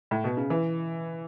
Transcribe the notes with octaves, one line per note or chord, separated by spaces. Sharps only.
A2
B2
C#3
E3